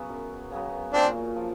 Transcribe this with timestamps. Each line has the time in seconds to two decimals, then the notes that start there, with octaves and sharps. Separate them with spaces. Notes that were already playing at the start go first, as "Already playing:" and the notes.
Already playing: C#3 F#3 B3
0.09 F#2
0.51 C#3 F#3 B3
0.93 A#2 C4 D4
1.36 F3